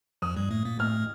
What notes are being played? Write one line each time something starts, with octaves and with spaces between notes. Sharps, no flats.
F2 F3 D#6
G2 G3
A2 A3
A#2 A#3
A2 A3 F6